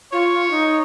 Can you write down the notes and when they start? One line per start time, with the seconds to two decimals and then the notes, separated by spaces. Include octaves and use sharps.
0.13 F4 C#5
0.50 D#4